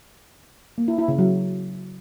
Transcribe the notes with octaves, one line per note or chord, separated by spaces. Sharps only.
A#3
E4
E4
C#3
F#3